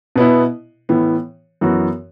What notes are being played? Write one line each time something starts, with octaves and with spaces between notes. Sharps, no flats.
B2 B3 E4
A2 E3 B3
F#2 E3 B3 F#4